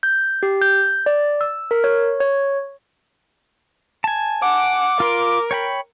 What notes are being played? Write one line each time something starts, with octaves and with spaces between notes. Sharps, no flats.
G6
G4
G6
D5
E6
A#4
C#5
C#5
G#5 A5
F#5 D6
F4 A#4 C6
C#5 G5 B5